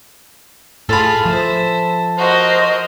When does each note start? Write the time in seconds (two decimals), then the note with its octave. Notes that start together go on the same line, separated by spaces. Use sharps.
0.89 A2 F4 G#4 A4 B5
1.25 F3 C5 E5
2.18 F#4 A#4 C5 D#5